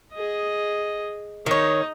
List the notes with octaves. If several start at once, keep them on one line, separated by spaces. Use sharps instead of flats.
G#4 D#5
D#3 D#4 C#5